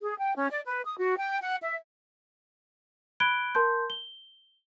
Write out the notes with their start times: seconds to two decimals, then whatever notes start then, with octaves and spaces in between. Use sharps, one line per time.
0.01 G#4
0.20 G5
0.35 C#4
0.50 D5
0.66 B4
0.85 D#6
0.99 F#4
1.18 G5
1.41 F#5
1.62 E5
3.20 B5 F#6 G#6 D7 G7
3.55 A#4 A5 C6 G6
3.90 G7